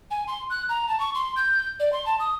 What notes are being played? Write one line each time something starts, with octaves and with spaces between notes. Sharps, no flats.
G#5
C6
F#6
A#5
A5
C#6
C6
G6
D5
C6
A5
D#6